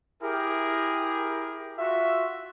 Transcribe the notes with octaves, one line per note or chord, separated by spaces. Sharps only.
E4 G4 G#4 A#4
F4 F#4 E5